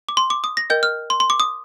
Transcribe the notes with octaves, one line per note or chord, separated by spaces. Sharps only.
D6
C6
D6
D#6
A#6
A#4 D#5 G5 G6
F6
C6
C6
D6
D#6